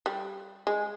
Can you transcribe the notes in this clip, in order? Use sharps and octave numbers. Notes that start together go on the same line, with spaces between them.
G3
G#3